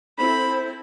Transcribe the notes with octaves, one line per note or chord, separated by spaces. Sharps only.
C4 E4 A4 C5 B5